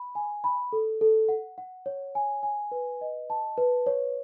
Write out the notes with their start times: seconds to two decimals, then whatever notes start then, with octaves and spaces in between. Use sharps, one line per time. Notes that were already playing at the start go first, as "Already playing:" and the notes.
Already playing: B5
0.15 G#5
0.44 B5
0.73 A4
1.01 A4
1.29 F#5
1.58 F#5
1.86 C#5
2.15 G#5
2.43 G#5
2.72 B4
3.01 D#5
3.30 A5
3.58 B4
3.86 C#5